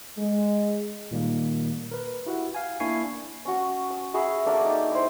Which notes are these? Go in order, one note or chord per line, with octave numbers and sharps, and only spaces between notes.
G#3
A#2 D#3 G3 A#3
A#4 B4
E4 F#4 G4 F#5
F5 G#5
A#3 D4 E4 G#5 C#6 C7
C#4 F#4
D#6
F#4 G#4 E5 B5
A#3 D4 A4 A#4
D#4 G5
E4 C5